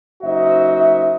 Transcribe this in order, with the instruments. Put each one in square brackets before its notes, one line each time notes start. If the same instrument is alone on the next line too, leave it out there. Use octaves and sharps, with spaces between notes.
[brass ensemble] F#1 D#4 F#4 C5 E5